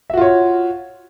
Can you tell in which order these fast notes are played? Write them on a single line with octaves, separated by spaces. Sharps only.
E5 F#4 F4 C#5